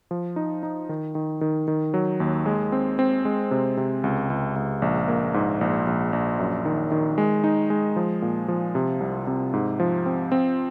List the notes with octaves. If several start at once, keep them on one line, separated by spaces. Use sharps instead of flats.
F3
D#4
D#4
D#3
D#3
D#3
D#3
F#3
D#2
G#3
C4
C4
G#3
C3
C3
C#2
C#2
C#2
A#1
A#3
G#2
A#1
A#1
A#1
F#2
D#3
D#3
G#3
D#4
G#3
F3
A#2
F3
C3
C2
C3
G#2
F3
C4
C4